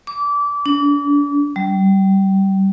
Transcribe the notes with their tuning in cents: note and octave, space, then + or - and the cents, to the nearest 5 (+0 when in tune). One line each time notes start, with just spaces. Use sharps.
D6 -25
D4 -35
G3 -20